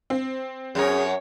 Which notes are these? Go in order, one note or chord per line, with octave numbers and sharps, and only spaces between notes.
C4
F#2 G#4 A#4 C#5